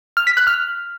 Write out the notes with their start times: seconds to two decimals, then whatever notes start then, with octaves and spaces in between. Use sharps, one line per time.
0.17 F6
0.27 B6
0.37 F#6
0.47 F6